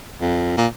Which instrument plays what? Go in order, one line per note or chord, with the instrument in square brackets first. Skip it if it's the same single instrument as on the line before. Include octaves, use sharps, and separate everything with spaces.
[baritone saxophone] F2
A#2